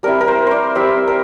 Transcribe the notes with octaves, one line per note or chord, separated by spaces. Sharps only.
G3 C4 E4 A#4
A#4
C5
C5 D5
G3 C4 E4 E5
A#4